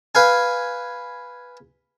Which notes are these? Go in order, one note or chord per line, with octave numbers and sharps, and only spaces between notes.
B4 F5 G#5